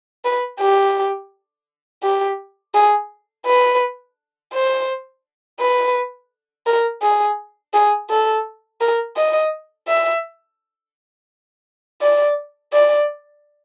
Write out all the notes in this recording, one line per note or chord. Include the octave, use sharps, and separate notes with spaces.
B4
G4
G4
G#4
B4
C5
B4
A#4
G#4
G#4
A4
A#4
D#5
E5
D5
D5